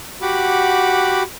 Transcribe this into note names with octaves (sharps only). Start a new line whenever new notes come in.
F#4 G4 F#5 B5 D6